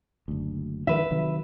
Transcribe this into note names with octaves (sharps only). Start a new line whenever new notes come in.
F#1 D2
D#3 E3 G#3 B4 E5
C3 D#3 F#3